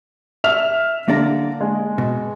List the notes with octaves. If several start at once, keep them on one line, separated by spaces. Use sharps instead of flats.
E5 F6 F7
D3 A#3 D5 A#5
G#3
B2